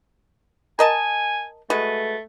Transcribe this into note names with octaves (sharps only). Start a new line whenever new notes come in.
A#4 D#5 G#5 A5
G#3 A3 F#4 B4